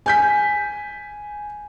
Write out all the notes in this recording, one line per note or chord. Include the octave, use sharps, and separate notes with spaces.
G#5 G6 B6